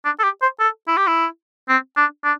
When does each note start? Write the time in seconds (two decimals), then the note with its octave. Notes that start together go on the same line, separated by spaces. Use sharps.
0.05 D4
0.19 A4
0.24 G4
0.42 C5
0.60 A4
0.88 E4
0.97 G4
1.07 E4
1.69 C4
1.97 D4
2.24 D4